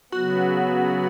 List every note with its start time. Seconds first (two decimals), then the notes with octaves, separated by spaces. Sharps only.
0.12 C#3 F#3 B3 F#4